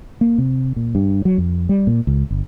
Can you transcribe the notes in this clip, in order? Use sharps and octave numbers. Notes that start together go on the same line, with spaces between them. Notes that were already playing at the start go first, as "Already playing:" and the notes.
A#3
C3
A#2
G2
F#3
F2
G3
A#2
C#2
G1